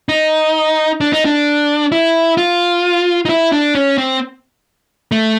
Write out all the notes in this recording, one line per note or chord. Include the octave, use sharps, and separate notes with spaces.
D#4
D4
D#4
D4
E4
F4
D#4
E4
D4
C#4
C4
A3